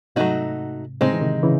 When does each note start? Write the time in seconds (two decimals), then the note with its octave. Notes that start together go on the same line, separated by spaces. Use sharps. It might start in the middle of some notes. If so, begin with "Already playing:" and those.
0.16 G#2 C3 F#3 A3 D#4 F#4
1.01 A2 C#3 G#3 C4 D#4
1.13 E3
1.21 C3 D#3
1.43 C#3 E3